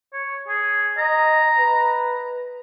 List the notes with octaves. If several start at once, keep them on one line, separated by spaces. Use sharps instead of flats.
C#5
G#4
D#5 A#5
B4